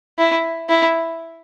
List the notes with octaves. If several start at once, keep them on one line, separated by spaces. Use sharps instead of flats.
E4
E4